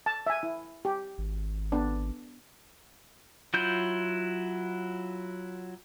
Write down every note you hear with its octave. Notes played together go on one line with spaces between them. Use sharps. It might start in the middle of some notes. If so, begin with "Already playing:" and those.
A5
E5 G#5
E4
G4
G#1
B3 D4
F#3 E4 F4 G6